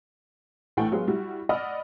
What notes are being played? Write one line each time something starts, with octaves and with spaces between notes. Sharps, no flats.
A#1 A2 E3 A3 F#5 G5
F#3 G#3 B3 F4 G#4
G3 E4 F#4
D5 D#5 F#5 B5 E6 F6